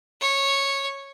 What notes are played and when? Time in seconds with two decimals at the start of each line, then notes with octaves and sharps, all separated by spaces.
0.21 C#5